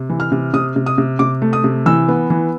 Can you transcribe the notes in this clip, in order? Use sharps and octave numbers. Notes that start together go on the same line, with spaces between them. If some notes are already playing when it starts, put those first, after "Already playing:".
Already playing: C3
E3
F6
C3
C3 D#6
C3
D#6
C3
C3 D6
A3
D#6
C3
E3 E6
B3
E3